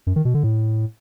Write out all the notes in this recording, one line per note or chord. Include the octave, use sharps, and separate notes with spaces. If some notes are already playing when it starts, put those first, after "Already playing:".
F#2
D#3
B2
D3
A2